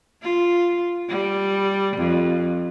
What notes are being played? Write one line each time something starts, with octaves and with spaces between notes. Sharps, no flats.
F4
G3
F2